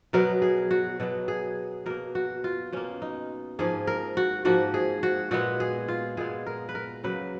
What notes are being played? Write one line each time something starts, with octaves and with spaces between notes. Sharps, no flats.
B2 F#3 B3 A#4
G#4
F#4
B2 F#3 B3
G#4
B2 A#3 A#4
F#4
F4
B2 A#3 C#4
D#4
G#2 F3 A#3 G#4
A#4
F#4
G#2 F3 A#3 F#4
G#4
F#4
A#2 G#3 B3 F#4
G#4
F4
A#2 G#3 B3 G#4
A#4
B4
A#4
C#3 F#3 A#3 B4